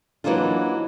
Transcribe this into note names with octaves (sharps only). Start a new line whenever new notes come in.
E3 F#3 A#3 D4 D#4 F4